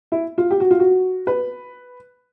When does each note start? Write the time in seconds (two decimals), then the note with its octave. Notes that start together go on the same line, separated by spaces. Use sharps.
0.12 E4
0.38 F4
0.51 G4
0.60 F#4
0.71 F4
0.80 F#4
1.27 B4